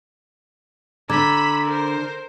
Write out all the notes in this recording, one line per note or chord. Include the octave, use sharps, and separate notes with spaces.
D3 A#5 B5 D6 E6 G#6
A#4 C5